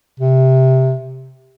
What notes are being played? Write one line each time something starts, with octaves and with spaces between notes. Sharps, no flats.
C3